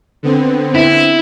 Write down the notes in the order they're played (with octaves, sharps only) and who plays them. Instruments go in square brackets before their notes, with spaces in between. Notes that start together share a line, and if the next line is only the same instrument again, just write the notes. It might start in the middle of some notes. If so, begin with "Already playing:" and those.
[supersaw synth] D3 B3 C4
[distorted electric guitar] E4